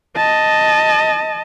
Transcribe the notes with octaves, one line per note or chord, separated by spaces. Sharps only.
D#5 A5